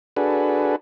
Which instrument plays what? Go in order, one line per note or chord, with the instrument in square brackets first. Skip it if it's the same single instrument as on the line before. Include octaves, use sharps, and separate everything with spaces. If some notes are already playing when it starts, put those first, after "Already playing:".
[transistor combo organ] D4 F#4 G#4 A4 B4